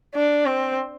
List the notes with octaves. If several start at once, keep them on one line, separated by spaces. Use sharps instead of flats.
D4
C4